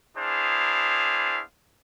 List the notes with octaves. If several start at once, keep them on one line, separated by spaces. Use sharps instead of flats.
B3 D4 E4 G#4 C5 F5